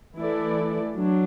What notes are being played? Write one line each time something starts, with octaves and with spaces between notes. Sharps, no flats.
E3 A3 E4 A4 D5
F#3 D4